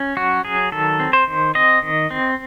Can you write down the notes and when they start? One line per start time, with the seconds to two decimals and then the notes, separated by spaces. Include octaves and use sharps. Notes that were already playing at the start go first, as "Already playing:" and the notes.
Already playing: C#4
0.17 F#3 F#4
0.44 F#3 G#4
0.72 D#3 A4
1.00 C4
1.13 C5
1.27 D#3
1.55 C4 D#5
1.82 D#3
2.11 C4